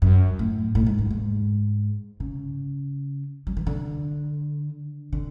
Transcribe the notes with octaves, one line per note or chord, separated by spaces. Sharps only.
F#2
A2
A2
G#2
F#2
G#2
C#3
F#3
E3
D3
D3